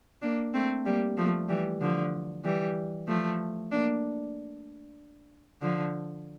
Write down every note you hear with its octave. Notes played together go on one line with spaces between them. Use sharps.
A#3 D4
A3 C4
G3 A#3
F3 A3
E3 G3
D3 F3
E3 G3
F3 A3
A#3 D4
D3 F3